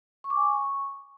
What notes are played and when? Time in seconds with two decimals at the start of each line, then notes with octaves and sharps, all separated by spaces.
0.24 C#6
0.30 D6
0.36 G#5
0.43 C#6